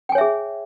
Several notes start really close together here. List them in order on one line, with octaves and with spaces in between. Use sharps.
G5 G#5 C#5 E5 G#4